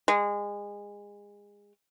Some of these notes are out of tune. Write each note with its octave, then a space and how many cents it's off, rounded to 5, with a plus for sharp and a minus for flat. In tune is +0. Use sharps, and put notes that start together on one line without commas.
G#3 -25